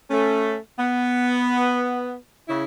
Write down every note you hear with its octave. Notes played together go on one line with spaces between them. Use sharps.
A3 C#4
B3
C#3 E4